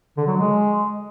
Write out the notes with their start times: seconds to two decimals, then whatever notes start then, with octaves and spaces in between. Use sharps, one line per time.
0.17 D3
0.27 F#3
0.37 G#3